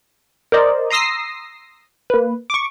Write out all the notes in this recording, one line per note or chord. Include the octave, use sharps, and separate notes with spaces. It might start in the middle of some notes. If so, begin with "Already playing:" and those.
A#4 C5 D5 D#5
A#5 C6 D#6 E6 A#6 C7
A#3 B4
C#6 D6